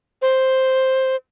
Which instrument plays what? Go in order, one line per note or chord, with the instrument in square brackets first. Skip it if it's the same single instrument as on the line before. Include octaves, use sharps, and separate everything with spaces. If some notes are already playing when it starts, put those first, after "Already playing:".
[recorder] C5